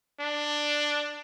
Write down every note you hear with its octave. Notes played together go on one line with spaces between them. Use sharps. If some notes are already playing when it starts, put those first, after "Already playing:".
D4